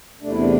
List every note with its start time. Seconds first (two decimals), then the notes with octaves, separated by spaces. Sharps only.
0.21 E2 C3 A3 D4
0.31 E4
0.40 D4